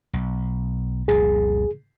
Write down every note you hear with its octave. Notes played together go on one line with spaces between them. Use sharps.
B1
F1 C2 A#2 G#4